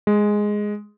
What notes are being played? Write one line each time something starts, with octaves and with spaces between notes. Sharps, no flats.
G#3